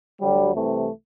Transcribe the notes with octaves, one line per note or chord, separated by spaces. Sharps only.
D2 D3 F#3 G3
C2 C3 E3 A3